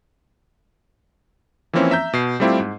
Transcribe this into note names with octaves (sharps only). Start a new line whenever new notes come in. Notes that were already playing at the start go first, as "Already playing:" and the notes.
E3 F3 A#3 C4 C#4 E4
E5 A#5 G6
B2 C7
G3 A3 C4 E4 F4 G4
G#2